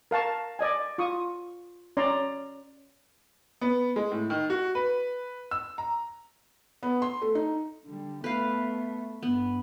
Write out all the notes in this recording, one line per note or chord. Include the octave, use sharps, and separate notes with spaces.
A#4 F5 A5 C#6
D5 D#5 G#5
F4 C#6 D#6
C#4 D5 A#5 C6
B3
G#3
A2
D#3
F#4
B4
E6
A#5
B3
C6
A3
D#4
D3 G3
A3 B3 B4 F5
G2 B3